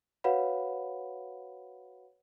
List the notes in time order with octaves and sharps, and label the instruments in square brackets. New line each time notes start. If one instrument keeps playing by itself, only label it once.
[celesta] F#4 B4 C#5 F5 F#5 B5